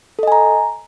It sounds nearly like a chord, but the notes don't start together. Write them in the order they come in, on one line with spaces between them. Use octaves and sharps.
A4 D#5 G#5 A#5